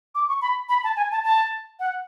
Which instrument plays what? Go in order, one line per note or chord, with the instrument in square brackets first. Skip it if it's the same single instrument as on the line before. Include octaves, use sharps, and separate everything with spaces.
[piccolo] D6
C#6
B5
B5
A5
G#5
A5
A5
F#5